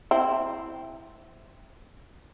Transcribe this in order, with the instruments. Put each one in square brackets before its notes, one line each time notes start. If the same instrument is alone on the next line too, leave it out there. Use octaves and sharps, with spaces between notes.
[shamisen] C4 E4